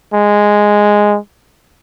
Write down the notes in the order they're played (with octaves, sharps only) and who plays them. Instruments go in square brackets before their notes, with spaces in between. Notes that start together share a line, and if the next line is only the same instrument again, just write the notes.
[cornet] G#3